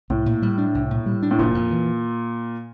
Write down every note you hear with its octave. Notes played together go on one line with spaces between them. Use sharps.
C2 A2
A#2
G3
D4
C2
A#2
G3
D4
A2
F1 A#2
F2
E3